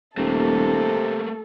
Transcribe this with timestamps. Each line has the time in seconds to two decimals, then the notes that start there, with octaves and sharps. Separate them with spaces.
0.17 D#1 C3 A3 A#3 A4